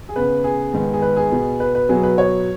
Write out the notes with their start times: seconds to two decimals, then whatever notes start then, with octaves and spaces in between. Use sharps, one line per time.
0.09 G#4
0.16 C#3 B3 B4
0.44 G#4
0.73 G#2 D#3 B3
0.94 G#4
1.02 B4
1.16 G#4
1.31 B2 B3
1.60 B4
1.75 B4
1.89 B2 F#3 B3 G#4
2.03 B4
2.18 C#5